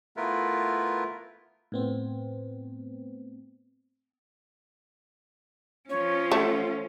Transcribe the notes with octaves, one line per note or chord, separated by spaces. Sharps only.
A3 B3 E4 F4 A#4 B4
A2 B3 C4
F3 C#4 C#5
A3 F#5